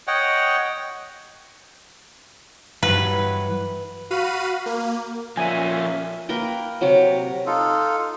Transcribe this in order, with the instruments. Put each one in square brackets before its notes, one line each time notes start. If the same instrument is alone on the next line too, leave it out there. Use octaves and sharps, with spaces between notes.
[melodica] C#5 D#5 F#5 G5
[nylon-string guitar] G2 E3 F#3 [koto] B4
[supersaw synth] F#4 F5 B5 D#7
A#3
[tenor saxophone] A#2 [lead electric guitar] F3 C#4 [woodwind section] F4 E5 [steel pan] G#5
[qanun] A#3 A#4 B4 G5
C3 F#3 G4 D6
[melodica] D#4 F4 A4